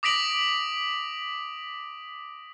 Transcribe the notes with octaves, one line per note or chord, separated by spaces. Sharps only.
D6 D#6 A#6 B6 D7 F#7